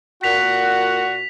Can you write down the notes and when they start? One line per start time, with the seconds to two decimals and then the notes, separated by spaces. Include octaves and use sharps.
0.23 A#2 F#4 F#5 B6 F7